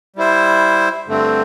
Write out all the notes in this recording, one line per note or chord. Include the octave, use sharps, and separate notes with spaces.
G3 E4 C5
G2 D3 A3 C4